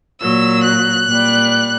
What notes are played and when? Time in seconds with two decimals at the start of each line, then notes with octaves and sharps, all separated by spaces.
0.20 A#2 F#3 E6
0.63 F#6
1.07 A#2 G3